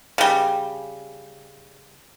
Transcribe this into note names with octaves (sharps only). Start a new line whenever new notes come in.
C#3 G3